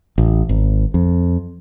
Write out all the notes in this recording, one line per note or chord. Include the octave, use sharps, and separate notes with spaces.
A1
G#1
F2